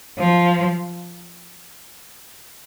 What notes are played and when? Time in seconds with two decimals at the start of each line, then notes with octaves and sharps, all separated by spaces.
0.19 F3